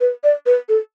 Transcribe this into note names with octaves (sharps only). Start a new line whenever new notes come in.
B4
D5
B4
A4